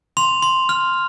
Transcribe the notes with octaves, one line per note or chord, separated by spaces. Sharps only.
C6 F7
C6
F6